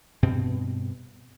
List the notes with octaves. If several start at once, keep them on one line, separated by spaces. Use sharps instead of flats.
G2 B2 C4